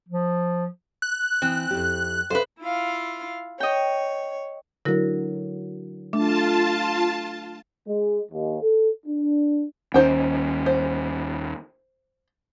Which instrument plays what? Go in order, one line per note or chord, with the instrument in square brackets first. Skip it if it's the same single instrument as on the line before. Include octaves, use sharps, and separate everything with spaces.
[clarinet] F3
[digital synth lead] F#6
[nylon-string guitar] E3 [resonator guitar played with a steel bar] C4
[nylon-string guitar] F2 E4 G4
[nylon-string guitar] A4 E5 F5 [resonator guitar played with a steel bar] B4 C5
[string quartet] E4 F4 F5
[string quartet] C#5 [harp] D#5 G5
[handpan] D3 F#3 [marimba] E4 F#4 A#4
[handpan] A3 [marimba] D4 [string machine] F4 A5
[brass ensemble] G#3
D#2
A4
D4
[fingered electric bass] D#2 C#4 [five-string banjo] D#4 C5 G5
[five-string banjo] C5